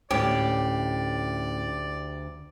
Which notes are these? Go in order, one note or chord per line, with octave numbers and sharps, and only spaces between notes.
D2 A2 C#4 G4 C#5 D5